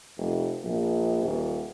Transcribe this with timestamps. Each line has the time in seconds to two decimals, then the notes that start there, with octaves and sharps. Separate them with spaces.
0.17 F1
0.64 A#1
1.22 D#1